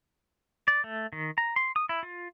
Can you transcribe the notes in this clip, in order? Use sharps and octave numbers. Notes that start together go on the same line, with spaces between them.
D5
A3
D#3
A#5
C6
D#6
E4
F4